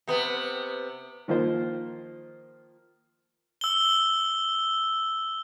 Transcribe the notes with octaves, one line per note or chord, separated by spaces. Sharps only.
C3 B3
D#3 F3 A#3 F4 A#4 C5
E6 G7